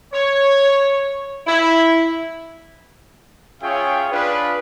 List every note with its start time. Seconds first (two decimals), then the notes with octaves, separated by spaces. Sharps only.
0.13 C#5
1.46 E4
3.62 C#4 F4 G#4 C#5 E5 G5
4.11 D4 F4 G#4 B4